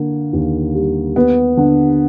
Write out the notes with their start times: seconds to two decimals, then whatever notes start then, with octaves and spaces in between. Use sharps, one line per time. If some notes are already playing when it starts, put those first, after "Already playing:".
Already playing: D3 A#3
0.33 D#2
0.75 G3
1.16 B3
1.57 D3